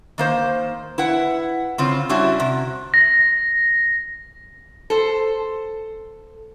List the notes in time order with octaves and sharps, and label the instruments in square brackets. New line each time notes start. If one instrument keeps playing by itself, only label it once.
[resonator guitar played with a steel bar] D#3 A#3 C5
E4 B4 F#5
C#3 C4 F4
G3 C#4 D4 E4 F#4
C3
[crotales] A#6
[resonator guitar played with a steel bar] A4 C5